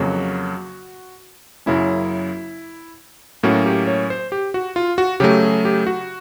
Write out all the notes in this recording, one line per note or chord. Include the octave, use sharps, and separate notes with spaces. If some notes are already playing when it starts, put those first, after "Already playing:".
Already playing: F2 C#3 F#3 A#3 F#4
F#2 C#3 F#3 A#3 C#4 E4
A2 F#3 A#3 C#4 F#4
G4
C#5
C5
G4
F#4
F4
F#4
C#3 F#3 A3 G4
G#4
G4
F#4